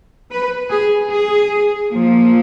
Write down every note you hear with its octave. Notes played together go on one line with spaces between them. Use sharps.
B4
G#4
G#4
A#2 F3 A#3